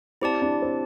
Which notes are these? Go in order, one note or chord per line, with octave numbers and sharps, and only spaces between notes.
C4 E4 G4 D5 A5
D4
C4